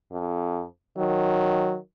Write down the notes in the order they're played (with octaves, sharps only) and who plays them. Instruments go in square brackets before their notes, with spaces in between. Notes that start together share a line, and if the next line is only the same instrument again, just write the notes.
[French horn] F2
[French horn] D#3 [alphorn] F#3